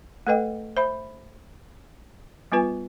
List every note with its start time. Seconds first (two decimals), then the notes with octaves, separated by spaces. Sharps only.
0.27 A3 A4 B4 D#5 G5
0.77 C5 E5 B5
2.52 G3 B3 F4 B4 G#5